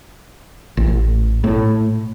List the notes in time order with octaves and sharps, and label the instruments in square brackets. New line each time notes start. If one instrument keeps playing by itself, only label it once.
[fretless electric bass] A1
A2